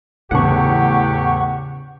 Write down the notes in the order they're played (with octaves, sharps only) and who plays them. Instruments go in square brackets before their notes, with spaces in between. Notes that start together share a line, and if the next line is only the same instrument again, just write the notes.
[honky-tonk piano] E2 A2 [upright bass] C#3 [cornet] G4 [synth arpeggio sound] F#5 C#6